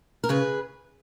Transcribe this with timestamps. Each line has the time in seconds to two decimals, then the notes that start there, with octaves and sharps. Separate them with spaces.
0.24 A#4
0.29 C#3 G#4 B4